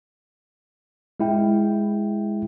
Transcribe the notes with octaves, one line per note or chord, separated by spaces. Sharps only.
G#3 E4 G5